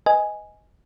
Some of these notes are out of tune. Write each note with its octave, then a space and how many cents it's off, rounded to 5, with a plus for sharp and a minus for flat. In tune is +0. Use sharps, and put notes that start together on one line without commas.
B4 +20 D#5 +10 G#5 +0